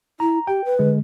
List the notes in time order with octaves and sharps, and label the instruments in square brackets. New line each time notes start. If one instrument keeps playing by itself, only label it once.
[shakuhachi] E4 [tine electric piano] A#5
[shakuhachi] G4 [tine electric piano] G5
[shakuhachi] B4
[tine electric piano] D3 G#3